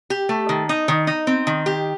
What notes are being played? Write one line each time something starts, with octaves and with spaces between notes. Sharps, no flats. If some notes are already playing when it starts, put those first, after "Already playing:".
G4
A3
D#3
D#4
D#3
D#4
C4
D#3
G4